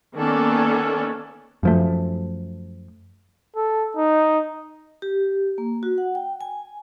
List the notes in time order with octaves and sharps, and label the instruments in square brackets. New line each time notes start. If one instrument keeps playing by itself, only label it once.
[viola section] D#3 A#3 B3 C#4 A4 D5
[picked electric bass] F#2 F3 A3
[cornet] A4
D#4
[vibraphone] G4
A#3
F#4
F#5
G5
G#5